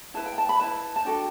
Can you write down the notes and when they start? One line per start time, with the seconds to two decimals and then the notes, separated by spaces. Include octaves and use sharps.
0.14 E4 B4 A5
0.26 G5
0.38 A5
0.49 B5
0.60 E4 B4 A5
0.96 A5
1.05 D4 F#4 A4 G5